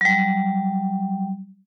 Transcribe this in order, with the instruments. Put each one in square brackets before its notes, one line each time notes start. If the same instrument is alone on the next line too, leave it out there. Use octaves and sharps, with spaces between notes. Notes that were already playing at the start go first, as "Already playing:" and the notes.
[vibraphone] F#3 G3